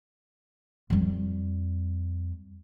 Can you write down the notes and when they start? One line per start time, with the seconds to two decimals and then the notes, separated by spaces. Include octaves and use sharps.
0.90 F2 G3